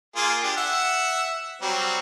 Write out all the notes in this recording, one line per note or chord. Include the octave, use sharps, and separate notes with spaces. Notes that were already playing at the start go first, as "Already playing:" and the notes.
A#3 F4 G#4
D4 G4
E5 F#5
F#3 G3 C4